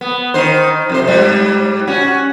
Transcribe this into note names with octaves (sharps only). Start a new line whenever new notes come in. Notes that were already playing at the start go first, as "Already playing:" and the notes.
B3
D#3 C5
F2 C3 C5
G#2 G3
C#4 F#4